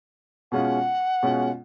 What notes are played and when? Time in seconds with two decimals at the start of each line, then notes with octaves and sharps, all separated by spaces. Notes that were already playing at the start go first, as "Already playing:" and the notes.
0.52 B2 G#3 C#4 F4 F#5
1.23 B2 G#3 C#4 F4